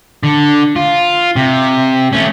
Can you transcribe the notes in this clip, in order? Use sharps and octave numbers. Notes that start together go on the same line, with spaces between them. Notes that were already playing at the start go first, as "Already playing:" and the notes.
D3
F4
C3
A3 C#4